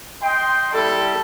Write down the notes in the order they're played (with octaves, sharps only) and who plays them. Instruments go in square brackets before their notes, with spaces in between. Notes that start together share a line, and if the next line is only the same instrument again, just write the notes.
[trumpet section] D#5 G5 C6
[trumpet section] G3 E4 A5 [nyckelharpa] A4